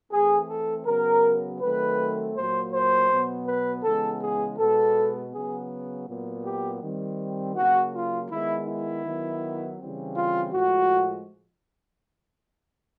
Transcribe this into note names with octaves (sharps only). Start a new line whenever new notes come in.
E3 A3 C4 G#4
A4
C#3 F#3 B3 A#4
D#3 F#3 A3 C4 B4
A#2 F#3 A#3 C5
C5
B2 F#3 B3
B4
C#3 E3 G#3 B3 A4
G#4
B2 G#3 B3 A4
C#3 F#3 B3 G#4
A#2 F#3 B3
G4
D#3 G3 C4
C#3 F#3 A#3 F#4
F4
D#3 G#3 B3 E4
E4
D#3 F#3 B3
C#3 E3 G3 C4
F4
A2 F3 G#3 F#4